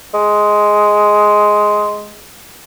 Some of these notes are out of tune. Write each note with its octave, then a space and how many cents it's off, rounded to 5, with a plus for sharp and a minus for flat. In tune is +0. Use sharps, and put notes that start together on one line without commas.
G#3 +5